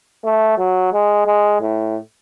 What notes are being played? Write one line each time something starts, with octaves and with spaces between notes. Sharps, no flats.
A3
F#3
G#3
G#3
A2